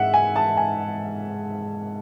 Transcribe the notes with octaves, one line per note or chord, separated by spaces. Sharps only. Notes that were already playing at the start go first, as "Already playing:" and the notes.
Already playing: G#2 E5 F#5
G#5
A5
G#5